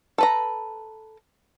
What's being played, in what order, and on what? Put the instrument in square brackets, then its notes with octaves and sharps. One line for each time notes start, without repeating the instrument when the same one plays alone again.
[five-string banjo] A4 B4 A#5